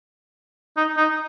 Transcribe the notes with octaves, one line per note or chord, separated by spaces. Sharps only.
D#4
D#4